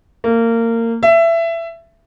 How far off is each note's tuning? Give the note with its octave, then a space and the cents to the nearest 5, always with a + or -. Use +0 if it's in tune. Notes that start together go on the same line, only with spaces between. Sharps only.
A#3 -25
E5 +20